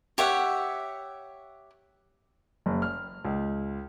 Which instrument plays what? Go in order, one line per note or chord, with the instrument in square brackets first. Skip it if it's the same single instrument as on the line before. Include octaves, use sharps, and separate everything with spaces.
[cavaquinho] G4 C#5 E5 F#5
[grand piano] F#1
F6
C#2